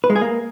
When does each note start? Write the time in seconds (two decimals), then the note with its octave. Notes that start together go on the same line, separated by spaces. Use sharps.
0.04 B4
0.10 G#3
0.16 G#4
0.21 A#3